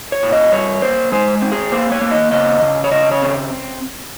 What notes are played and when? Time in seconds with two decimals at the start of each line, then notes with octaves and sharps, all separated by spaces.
0.12 C#5
0.23 A#2
0.32 D#5
0.52 G2 C#5
0.82 A#3 C5
1.12 G#3 C5
1.42 C4
1.52 G#4
1.72 A#3 C5
1.92 C#5
2.01 A#3
2.11 D#5
2.31 C#3 D#5
2.62 C#3
2.84 C#5
2.91 C#3 D#5
3.12 C#5
3.22 C4